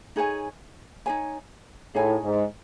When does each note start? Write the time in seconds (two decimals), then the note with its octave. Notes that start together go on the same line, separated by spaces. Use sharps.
0.16 D#4 G#4 C#5 G#5
1.06 D#4 G#4 C#5 G#5
1.94 A2 D#4 G#4 C#5 G#5
2.25 G#2